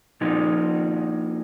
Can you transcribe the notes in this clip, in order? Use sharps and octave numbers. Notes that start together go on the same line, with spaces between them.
A#2 F3 D#4